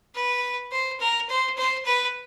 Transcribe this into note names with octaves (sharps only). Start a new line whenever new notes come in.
B4
C5
A#4
C5
C5
B4